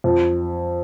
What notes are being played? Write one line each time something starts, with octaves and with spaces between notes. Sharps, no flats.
F2